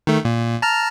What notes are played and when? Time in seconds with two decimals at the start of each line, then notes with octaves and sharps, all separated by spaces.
0.07 D#3 A3
0.25 A#2
0.62 A5 A#5 F6